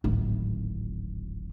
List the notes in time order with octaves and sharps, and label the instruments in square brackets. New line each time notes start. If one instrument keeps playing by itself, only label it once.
[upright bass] D1 G#1